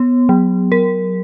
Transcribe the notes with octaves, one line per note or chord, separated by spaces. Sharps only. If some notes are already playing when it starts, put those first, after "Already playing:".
Already playing: B3
F#3
A#4